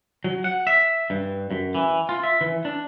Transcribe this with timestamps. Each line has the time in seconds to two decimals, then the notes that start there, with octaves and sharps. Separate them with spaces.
0.24 F#3
0.44 F#5
0.67 E5
1.10 G2
1.51 F#2
1.75 E3
2.09 F4
2.24 E5
2.41 E3
2.65 D4